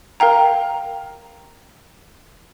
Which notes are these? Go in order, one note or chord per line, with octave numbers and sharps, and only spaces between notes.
A#4 F5 G5 A#5